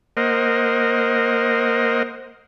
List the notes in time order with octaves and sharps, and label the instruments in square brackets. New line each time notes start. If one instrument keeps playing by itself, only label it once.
[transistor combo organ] A#3 A#4 C5 D#5 F#5